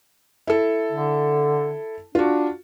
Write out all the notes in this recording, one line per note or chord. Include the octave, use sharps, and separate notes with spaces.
E4 A4
D3
D4 F4 F#4